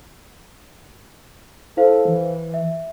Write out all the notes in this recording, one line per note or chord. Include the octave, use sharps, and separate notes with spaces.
E4 A4 C5 F5
E3
E5